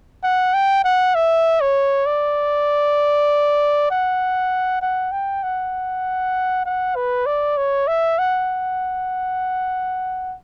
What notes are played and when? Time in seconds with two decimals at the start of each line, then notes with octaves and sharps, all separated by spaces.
0.24 F#5
0.54 G5
0.84 F#5
1.15 E5
1.61 C#5
2.06 D5
3.91 F#5
4.82 F#5
5.12 G5
5.43 F#5
6.66 F#5
6.96 B4
7.26 D5
7.58 C#5
7.88 E5
8.19 F#5